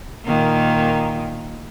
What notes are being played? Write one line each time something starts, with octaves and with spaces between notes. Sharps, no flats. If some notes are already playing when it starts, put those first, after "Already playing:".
A#2 D#3 A#3